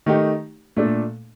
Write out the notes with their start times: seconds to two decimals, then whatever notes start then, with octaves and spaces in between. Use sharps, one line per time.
0.06 D#3 A3 D#4 G4
0.77 A#2 A3 D4 A4